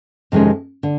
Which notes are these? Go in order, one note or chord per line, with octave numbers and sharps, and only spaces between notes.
F2 C3 D#3 G#3 C#4
D3